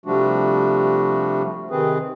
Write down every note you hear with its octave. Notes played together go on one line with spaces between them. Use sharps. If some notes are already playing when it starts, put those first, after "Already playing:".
C3 F3 G3 A3 D4 F#4
C3 D#3 C4 G#4 B4